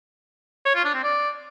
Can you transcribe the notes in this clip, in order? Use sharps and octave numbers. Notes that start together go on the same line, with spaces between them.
C#5
F4
D4
C4
D5